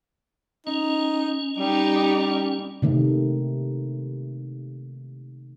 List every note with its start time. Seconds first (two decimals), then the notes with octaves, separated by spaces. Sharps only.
0.67 C#4 D#4
1.59 G3 D#4 G4
2.82 C3 D#3 A3